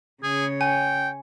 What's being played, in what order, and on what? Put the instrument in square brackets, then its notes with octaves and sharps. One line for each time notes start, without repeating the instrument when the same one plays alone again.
[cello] C#3 C#5 [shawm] G#4
[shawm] G5 [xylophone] G#5